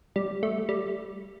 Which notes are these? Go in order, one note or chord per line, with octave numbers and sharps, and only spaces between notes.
G3
A3
G3